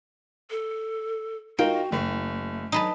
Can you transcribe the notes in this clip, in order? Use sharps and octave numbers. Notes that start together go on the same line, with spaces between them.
A4
D#4 F4 F#4 A#4 G5
F#1 A3
F#3 D#4 B4 A5